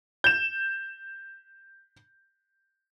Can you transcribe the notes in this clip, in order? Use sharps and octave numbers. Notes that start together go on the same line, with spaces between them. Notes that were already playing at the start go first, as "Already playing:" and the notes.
G6 E7